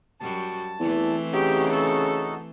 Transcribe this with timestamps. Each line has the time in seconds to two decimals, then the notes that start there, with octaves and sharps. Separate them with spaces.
0.20 F#2 G3 F#4 A5
0.80 E2 E3 A3 C4
1.33 C#3 D#4 F#4 G4
1.72 A4